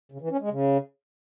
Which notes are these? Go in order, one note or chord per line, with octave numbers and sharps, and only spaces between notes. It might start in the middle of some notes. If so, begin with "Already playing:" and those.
C#3
E3
C#4
G#3
C#3